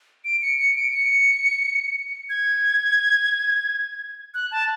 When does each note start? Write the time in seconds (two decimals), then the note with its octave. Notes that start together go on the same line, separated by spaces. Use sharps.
0.25 D7
0.42 C#7
0.59 C#7
0.76 D7
0.93 C#7
2.30 G#6
4.34 F#6
4.52 A5